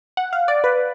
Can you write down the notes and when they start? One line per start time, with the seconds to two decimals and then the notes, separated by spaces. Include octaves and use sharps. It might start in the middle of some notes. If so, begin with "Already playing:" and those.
0.17 F#5
0.33 F5
0.48 D5
0.64 B4